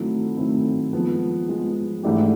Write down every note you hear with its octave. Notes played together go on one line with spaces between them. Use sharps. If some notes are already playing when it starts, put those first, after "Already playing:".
Already playing: D#3 F#3 A3 C4 E4
D#3 F#3 A3 C4 E4
F3 G#3 B3
F3 G#3 B3
G#2 E3 A3 D4 G4